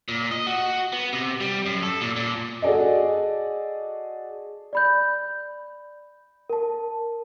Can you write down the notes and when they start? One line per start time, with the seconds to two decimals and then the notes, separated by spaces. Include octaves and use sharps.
0.08 A#2
0.31 D#5
0.47 F#4
0.93 B3
1.13 C3
1.41 G3
1.66 F#2
1.83 A4
2.01 A#2
2.16 A#2
2.62 F#4 G#4 A4 D5 D#5
4.73 D5 B5 G6
6.50 A#4 A5